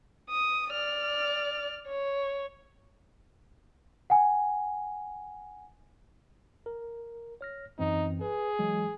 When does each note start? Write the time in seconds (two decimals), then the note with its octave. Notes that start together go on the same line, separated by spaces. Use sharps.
0.30 D#6
0.72 D5 F6
1.88 C#5
4.10 F#5 G#5
6.66 A#4
7.41 C#5 F6 A#6
7.79 F#2 E3 C4 D#4
8.21 G#4 B4
8.59 E3 F#3 G#3